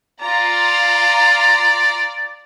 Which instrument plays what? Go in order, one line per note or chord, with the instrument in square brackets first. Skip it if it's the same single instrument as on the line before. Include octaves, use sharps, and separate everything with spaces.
[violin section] F4 A#5 [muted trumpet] D5